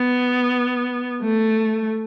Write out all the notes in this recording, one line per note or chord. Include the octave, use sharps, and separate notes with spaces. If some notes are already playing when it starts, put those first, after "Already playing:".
Already playing: B3
A3